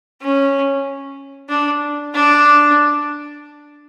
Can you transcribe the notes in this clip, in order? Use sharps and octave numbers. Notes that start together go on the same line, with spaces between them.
C#4
D4
D4